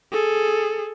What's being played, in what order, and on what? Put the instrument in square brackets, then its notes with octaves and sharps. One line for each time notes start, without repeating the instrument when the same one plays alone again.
[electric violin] G#4 A4